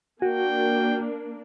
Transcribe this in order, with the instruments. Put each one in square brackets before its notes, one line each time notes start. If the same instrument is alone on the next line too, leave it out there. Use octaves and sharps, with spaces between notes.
[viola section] A#3 D4 [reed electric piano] F#4 [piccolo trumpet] G5